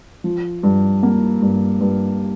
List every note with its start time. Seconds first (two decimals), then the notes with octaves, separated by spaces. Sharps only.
0.24 F3
0.63 G2
1.03 A#3
1.42 G2
1.81 G2